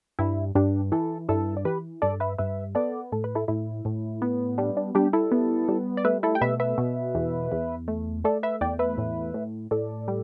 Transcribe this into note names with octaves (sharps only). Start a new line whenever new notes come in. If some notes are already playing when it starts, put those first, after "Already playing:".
G2 E4
G2 D4 G4
E3 E4 A4
G2 E4 A4
D5
E3 G4 B4
G2 A4 D5
B4 E5
G2 B4 E5
B3 A4 D5
A2 A4
B4
E4 A4
A2 E4
A2
B3
G3 D4
D4
G3 D4 G4
E4 A4
B3
G3
D5
A3 B4 E5
E4 A4
G5
B2 B4 E5
B4 E5
B2
E2
E2
A3
A3 A4 D5
B4 E5
E2 D5 G5
B4 E5
A2
A2
A2 A4 D5
G3